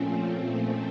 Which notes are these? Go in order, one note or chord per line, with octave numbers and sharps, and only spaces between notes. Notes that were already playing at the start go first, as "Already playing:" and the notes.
Already playing: A#2 F3 A3 C4 C#4